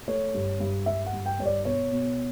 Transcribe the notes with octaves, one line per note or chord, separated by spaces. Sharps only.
A3 C#5
G2
G2
G2 E5
F#5
G2
G5
G2 C#5
D5
B2 C#5
B2